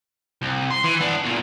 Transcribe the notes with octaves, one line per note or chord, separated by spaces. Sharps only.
C2
C6
E3
B3 D4
E2 A#2